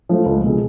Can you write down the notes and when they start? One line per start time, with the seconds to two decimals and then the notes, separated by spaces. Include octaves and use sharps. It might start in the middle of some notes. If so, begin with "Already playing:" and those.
0.09 F3 A3
0.26 C#2
0.44 B2 G#3